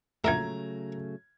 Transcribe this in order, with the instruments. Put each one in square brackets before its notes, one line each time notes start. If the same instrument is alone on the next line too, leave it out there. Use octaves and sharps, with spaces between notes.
[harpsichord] A#1 A#4 E5 [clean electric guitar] C#3 F#3 A3 [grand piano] A#5 G#6